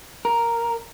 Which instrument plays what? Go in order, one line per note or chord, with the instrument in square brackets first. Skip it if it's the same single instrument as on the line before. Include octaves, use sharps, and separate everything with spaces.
[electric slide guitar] A#4